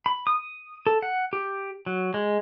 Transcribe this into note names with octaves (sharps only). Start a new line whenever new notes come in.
B5
D#6
A4
F#5
G4
F#3
G#3